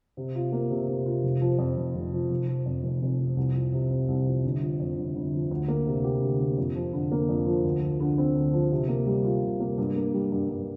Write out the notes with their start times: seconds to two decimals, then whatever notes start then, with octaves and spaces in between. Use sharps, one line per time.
0.17 C3
0.35 F4
0.52 A#3
0.70 C3
0.88 C3
1.06 F4
1.23 F1
1.41 F3
1.59 F2
1.77 F1
1.95 F1
2.13 F3
2.31 F1
2.48 F3
2.66 F2
2.83 F1
3.02 F1
3.19 F3
3.37 C2
3.54 F3
3.73 C3
3.91 C4
4.08 C2
4.26 F3
4.44 G1
4.62 F3
4.80 F2
4.97 G1
5.15 G1
5.34 F3
5.51 D2
5.68 A#3
5.86 C3
6.04 G4
6.21 D2
6.40 A#3
6.58 F2
6.76 F3
6.93 D3
7.12 A#3
7.29 F2
7.47 F3
7.64 D2
7.82 F3
8.00 D3
8.18 C4
8.35 D2
8.53 F3
8.72 C3
8.88 A#3
9.07 G3
9.25 F4
9.42 C3
9.60 A#3
9.78 G2
9.96 A#3
10.14 G3
10.32 G2
10.49 G2